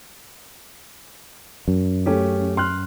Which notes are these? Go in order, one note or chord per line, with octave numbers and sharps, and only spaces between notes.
F#2
A3 C#4 G4
C6 F6 F#6